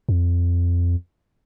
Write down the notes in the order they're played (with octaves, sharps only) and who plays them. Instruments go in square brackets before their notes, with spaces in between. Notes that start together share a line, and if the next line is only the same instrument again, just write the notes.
[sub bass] F2